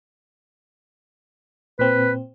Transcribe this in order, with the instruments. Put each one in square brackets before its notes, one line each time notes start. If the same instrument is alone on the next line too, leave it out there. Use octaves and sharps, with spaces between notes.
[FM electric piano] A#2 C4 [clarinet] B4